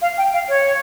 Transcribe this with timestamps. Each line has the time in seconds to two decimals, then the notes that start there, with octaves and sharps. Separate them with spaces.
0.02 F5
0.18 G5
0.34 F5
0.49 C#5